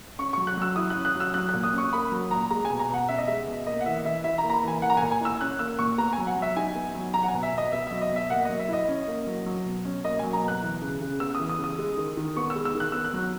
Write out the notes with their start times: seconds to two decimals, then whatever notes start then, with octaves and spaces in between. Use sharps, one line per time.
0.18 C#4 C#6
0.33 F#3 C#6
0.47 F#6
0.57 F#3 E6
0.76 E4 D#6
0.90 F#6
0.96 C#4
1.05 F#6
1.15 F#3
1.20 E6
1.34 F#3 F#6
1.49 A#2 F#6
1.63 D#6
1.73 C#4 C#6
1.93 A#3 B5
2.12 F#3
2.31 A#2 A#5
2.50 G#3 A#5
2.65 B2 G#5
2.79 A#5
2.89 B2 F#5
3.08 C#4 E5
3.18 D#5
3.27 G#3 E5
3.47 B2
3.66 A#3 D#5
3.81 F#5
3.86 E3 E5
4.05 E3 E5
4.24 E4 E5
4.38 A#5
4.43 A#3
4.50 A#5
4.54 B5
4.63 E3 G#5
4.82 A#3 F#5
4.90 A#5
4.97 A#2 G#5
5.12 G#5
5.21 E4 E6
5.40 C#4 F#6
5.59 A#3 E6
5.78 A#2 C#6
5.98 B3 A#5
6.13 G#5
6.18 F#3
6.27 F#5
6.37 F#3
6.42 E5
6.56 D#4 G#5
6.75 B3
6.95 F#3
7.14 F#3 A#5
7.23 F#5
7.28 G#5
7.33 B2
7.43 E5
7.53 B2 D#5
7.72 B3 E5
7.87 F#3 E5
8.01 D#5
8.11 B2 E5
8.30 A#3 F#5
8.45 F#3 D#5
8.60 E5
8.68 E4 D#5
8.88 C#4
9.08 A#3
9.27 F#3
9.46 F#3
9.65 B2
9.85 C#4
10.04 A#3 D#5
10.19 F#3 G#5
10.33 A#5
10.43 B2
10.48 F#6
10.62 E3
10.82 C#3
11.01 C#3
11.20 B3 E6
11.35 E3 D#6
11.49 D#6
11.59 C#3
11.64 D#6
11.78 G#3
11.97 D#3
12.17 D#3
12.36 B3 C#6
12.50 E6
12.55 G#3
12.65 E6
12.75 D#3
12.80 F#6
12.92 B3 E6
13.05 F#6
13.14 F#3